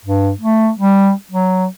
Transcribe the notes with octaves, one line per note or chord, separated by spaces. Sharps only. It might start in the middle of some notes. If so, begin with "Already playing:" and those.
G2
A3
G3
F#3